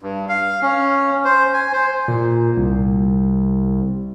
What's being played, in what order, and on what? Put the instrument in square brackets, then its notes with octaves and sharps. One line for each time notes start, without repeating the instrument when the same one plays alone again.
[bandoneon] G2
F5
C#4
C5
G#5
C5
[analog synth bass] A#2
C2